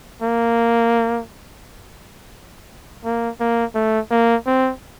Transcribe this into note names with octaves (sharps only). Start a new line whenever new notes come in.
A#3
A#3
A#3
A3
A#3
C4